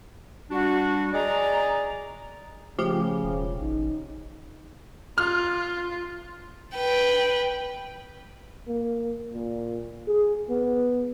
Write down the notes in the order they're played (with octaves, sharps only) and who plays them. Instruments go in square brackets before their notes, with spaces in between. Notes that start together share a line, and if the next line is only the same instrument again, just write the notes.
[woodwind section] G3 D4 F#4
G#4 D5 D#5 A#5
[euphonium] C#3 [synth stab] F3 G4 [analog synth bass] A3
[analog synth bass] E1
[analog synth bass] A1 [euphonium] D#4
[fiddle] F4 [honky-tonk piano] F6
[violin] B4 G5
[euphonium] A#3
A#2
G#4
B3